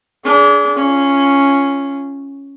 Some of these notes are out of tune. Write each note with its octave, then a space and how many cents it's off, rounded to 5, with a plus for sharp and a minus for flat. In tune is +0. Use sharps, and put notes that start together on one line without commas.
D4 -30 G#4 +10
C#4 +0 F4 -25